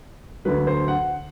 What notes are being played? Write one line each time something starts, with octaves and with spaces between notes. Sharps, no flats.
D2 D3 F#3 B4
C5
F#5